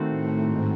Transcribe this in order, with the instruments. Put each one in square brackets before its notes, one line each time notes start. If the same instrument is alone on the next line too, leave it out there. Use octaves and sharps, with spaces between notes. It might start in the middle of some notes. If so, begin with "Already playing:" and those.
Already playing: [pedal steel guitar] D#3 A3 C4 F#4 C5
[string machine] A2
G#2